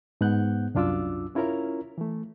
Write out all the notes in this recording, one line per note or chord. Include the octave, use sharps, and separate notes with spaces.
G#2 B3 F#5 F#6 G6
C2 F#2 D4 F4 D6 E6
C#4 E4 F4 A#4 C#5 A#5
E3 A3